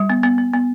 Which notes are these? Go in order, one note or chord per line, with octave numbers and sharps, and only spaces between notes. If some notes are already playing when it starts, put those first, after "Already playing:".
Already playing: G3
B3
B3
B3
B3